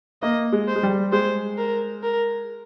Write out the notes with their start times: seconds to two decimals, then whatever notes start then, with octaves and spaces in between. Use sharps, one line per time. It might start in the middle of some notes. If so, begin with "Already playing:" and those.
0.22 A#3 D#5
0.52 G#3
0.68 C5
0.75 G#3
0.83 G3
1.12 G#3 C5
1.58 A#4
2.03 A#4